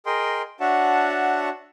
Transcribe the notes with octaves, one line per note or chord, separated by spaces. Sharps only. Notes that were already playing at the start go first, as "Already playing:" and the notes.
G#4 A#4 D#5 G5 C6
D4 F#4 C#5 E5 F#5 A5